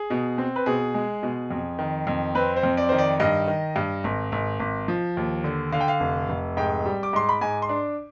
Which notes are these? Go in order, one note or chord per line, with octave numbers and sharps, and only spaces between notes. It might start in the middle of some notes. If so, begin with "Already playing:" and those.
Already playing: G#4
B2
C4
B4
B2 G#4
G#3
B2
F2
D#3
F2
C4 B4
C5
F2
D5
D#3 C5
D5
G2 D#5
D#3
G2
G#1
G#1
G#1
F3
D#2
D3
D3 F5
G5
F5
F1
F1
G#2 G5
G3
D6
G#2 C6
B5
G#2 G#5
C6
D4